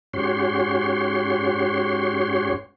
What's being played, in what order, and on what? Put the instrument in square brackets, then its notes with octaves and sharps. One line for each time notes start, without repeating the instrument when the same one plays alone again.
[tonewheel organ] G#2 C#4 F#4 G4 C#5 C6